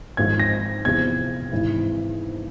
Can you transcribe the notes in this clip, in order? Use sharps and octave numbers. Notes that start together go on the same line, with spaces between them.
G#1 G#2 F3 G#6
A#6
E2 C3 F3 G#6
G#1 G#2 E3